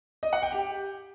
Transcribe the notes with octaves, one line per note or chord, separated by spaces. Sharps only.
D#5
F#5
G5
G4